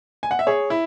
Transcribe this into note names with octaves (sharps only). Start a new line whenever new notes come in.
G#5
F#5
E5
G#4 C#5
E4